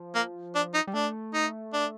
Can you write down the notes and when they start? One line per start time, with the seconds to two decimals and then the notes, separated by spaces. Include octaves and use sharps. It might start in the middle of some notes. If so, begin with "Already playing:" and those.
Already playing: F3
0.15 A#3
0.55 D4
0.74 D#4
0.87 G3
0.94 A3 D4
1.34 D#4
1.73 D4